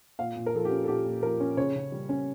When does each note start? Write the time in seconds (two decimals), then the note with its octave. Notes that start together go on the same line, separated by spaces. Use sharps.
0.19 A#2 F5
0.36 A#2
0.46 A#4
0.54 F3 A4
0.65 G4
0.71 C#4
0.84 A4
0.88 A#2 G4
1.05 A#2
1.22 F3 A#4
1.40 C#4
1.57 C#3 C#5
1.75 C#3
1.92 G3
2.09 C#4